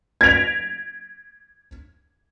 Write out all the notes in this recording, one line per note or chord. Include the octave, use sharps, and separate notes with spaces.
G#6 A#6 B6 D7 F7